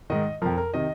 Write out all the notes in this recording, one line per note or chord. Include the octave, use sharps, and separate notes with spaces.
G#2 D#3 D#5
F2 F3 A#4
A#4
C3 D#3 D#5